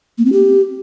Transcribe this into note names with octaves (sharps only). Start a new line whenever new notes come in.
A#3
C4
G4